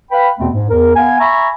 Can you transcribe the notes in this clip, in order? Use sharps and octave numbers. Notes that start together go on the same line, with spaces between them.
B4 F5 G5 B5
E2 B2 A3 B3 C4
G#2
E2 A#4
B3 F5 G#5
E5 G#5 A#5 B5 C#6